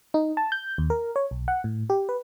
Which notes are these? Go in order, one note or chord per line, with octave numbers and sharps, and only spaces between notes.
D#4
A5
G6
D#2
A#4
C#5
B1
F#5
A2
G4
B4